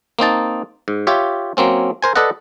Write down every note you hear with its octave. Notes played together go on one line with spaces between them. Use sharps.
A#3 C4 D#4 A5
G#2
F4 G4 C#5 E5
F#3 A#3 C4 C#4
A#4 C5 G#5
A4 B4 D5 D#5 F#5